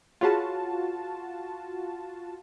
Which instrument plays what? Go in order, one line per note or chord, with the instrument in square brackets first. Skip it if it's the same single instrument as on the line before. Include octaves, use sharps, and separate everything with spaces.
[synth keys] F4 F#4 A5 [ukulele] G#4 B4 C#5